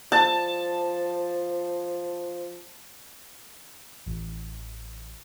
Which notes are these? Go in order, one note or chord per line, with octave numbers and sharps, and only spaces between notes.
F3 A5
A1